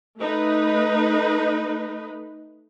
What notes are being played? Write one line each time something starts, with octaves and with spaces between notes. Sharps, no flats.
A3 D#4 B4